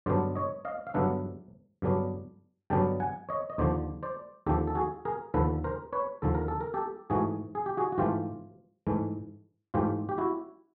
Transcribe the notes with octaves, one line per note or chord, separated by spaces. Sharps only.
G2 D3 F#3 B3 D4 C5 D5
C#5 D#5
D#5 F5
F5
G2 D3 F#3 B3 D4 E5 F#5
G2 D3 F#3 B3 D4
G2 D3 F#3 B3 D4 G5 A5
F#5 G#5
C#5 D#5
D#5
D#2 D3 F3 C5 D5
C5 D5
D#2 D3 F3 G4 A4
A4
F#4 G#4
G#4 A#4
D#2 D3 F3 A4 B4
A#4 C5
B4 C#5
D#2 D3 F3 A4
A#4
A4
A#4
G4 A4
G#2 E3 A3 F#4 G#4
G#4
G4
F#4 G#4
F#4
G#2 E3 A3 F4 G4
G#2 E3 A3
G#2 E3 A3 F4 G4
G4
E4 F#4